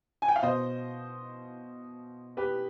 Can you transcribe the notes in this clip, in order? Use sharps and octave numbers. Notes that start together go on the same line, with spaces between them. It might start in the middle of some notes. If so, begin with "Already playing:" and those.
G#5
G5
F5
B2 C5 D#5
G4 B4